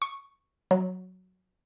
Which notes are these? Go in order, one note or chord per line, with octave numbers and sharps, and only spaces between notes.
C#6
F#3